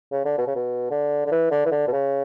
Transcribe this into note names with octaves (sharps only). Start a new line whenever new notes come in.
C#3
D3
B2
C#3
B2
D3
D3
E3
D3
E3
D3
B2
C#3